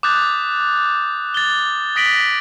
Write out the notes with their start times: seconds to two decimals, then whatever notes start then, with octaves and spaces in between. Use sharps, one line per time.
0.03 D6 D#6 F#6 G6 A6
1.34 A6 G7
1.96 D#6 A#6 B6 D7 F#7 G7